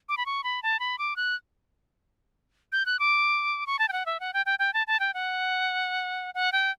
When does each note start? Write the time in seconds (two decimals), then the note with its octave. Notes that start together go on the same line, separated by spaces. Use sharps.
0.09 D6
0.17 B5
0.26 C#6
0.44 B5
0.63 A5
0.80 B5
0.98 D6
1.16 F#6
2.72 G6
2.86 F#6
2.99 D6
3.67 C#6
3.79 A5
3.88 G5
3.93 F#5
4.06 E5
4.20 F#5
4.34 G5
4.46 G5
4.59 G5
4.74 A5
4.87 A5
5.00 G5
5.14 F#5
6.35 F#5
6.52 G5